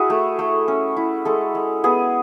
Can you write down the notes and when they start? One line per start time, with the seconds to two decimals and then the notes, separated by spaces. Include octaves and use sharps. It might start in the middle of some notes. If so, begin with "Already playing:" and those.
Already playing: E4 F#4 G#4
0.10 A3
0.39 A3
0.68 C#4
0.97 E4
1.25 G#3 A4
1.55 G#3
1.84 B3 G#4